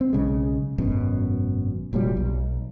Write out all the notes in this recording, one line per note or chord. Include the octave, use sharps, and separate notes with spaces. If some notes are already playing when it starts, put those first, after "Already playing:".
C4
B1 C#3 G#3
G#1 F#2 B2
F1 A#2 F#3 G3
B1